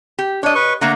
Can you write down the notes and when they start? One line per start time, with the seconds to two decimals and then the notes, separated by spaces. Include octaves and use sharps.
0.19 G4
0.43 D4 C#5 D#5
0.55 B4 C#6
0.81 D3 A3 A#3 F#5 A#5